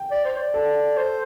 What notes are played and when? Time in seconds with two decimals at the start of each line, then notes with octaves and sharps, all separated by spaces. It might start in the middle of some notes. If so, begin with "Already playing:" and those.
Already playing: G5
0.11 D5
0.25 C5
0.38 D5
0.54 A4
0.97 C5